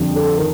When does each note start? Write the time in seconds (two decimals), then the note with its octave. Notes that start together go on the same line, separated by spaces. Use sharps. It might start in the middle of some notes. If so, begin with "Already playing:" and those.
Already playing: F2 D3 G3
0.15 A4
0.37 D#3 A#4